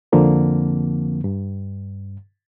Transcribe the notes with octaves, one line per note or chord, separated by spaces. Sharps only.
F2 D3 F3 A#3 C4
G2